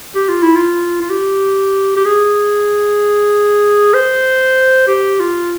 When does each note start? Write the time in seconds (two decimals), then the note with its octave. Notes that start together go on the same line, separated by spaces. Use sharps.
0.15 G4
0.29 F4
0.42 E4
0.55 F4
1.01 F4
1.10 G4
1.97 G4
2.05 G#4
3.94 C5
4.88 G4
5.20 F4